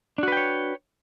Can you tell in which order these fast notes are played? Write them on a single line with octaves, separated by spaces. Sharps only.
D4 F#4 B4 G5 C#5